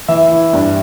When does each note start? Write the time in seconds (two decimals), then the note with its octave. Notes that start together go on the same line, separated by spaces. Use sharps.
0.08 E3 E5
0.31 E4
0.53 G2